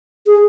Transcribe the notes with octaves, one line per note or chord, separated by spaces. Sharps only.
G#4